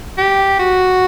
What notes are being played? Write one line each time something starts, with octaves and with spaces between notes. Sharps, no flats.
G4
F#4